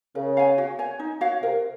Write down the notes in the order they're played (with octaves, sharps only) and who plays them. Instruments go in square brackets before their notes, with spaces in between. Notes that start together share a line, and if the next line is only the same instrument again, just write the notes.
[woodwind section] C#3 [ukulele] A#4
[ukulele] F5 G#5
F#4
C#5 G#5
D#4
F#4 C#5 F5
[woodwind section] C3 [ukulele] A#4